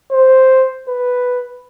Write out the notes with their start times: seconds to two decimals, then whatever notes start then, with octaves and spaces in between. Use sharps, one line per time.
0.12 C5
0.88 B4